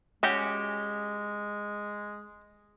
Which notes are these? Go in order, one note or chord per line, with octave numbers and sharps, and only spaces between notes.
G#3 C#4 F#4 G4